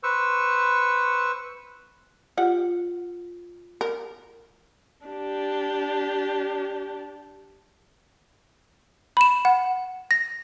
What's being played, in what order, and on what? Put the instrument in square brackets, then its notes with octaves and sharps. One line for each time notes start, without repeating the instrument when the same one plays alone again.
[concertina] B4 C5 C#6 E6
[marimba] F4 [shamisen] G4 F#5
[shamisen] A#4
[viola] D4 G4
[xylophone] B5 E7
F#5
A#6